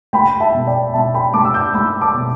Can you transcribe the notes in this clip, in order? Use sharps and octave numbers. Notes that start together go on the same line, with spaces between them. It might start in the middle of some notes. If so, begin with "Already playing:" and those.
A3 G5 B5
E5 A5
B2
D5 G5
B2 E5 A5
G5 B5
A3 A5 D6
E6
D6 G6
A3 B5 E6
A5 D6
B2